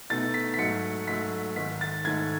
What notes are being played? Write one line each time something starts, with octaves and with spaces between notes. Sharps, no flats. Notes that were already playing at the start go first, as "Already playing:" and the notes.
B2 A3 D#4 A6
B6
B6
G#2 F#3 A3 C#7
G#2 F#3 A3 B6
G#2 D#3 A3 B6
A6
G#2 D#3 A3 G#6